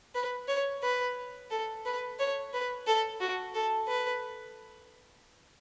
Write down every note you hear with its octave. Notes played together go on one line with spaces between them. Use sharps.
B4
C#5
B4
A4
B4
C#5
B4
A4
F#4
A4
B4